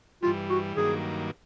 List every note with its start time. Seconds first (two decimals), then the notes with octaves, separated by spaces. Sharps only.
0.23 G2 E3 G3 F4
0.50 F#4
0.77 G2 D#3 F#3 A#3 G#4